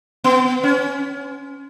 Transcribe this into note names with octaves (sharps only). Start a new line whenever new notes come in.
B3
C#4